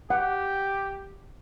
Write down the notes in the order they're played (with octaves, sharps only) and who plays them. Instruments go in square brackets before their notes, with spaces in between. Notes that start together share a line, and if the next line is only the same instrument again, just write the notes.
[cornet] G4 [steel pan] F#5